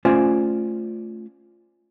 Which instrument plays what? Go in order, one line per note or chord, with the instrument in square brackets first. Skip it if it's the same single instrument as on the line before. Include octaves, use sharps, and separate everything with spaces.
[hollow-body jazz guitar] A3 C#4 F4 C5 D5 G#5